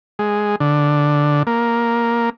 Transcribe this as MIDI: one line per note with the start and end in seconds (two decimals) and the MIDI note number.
0.19 0.56 56
0.60 1.43 50
1.47 2.30 58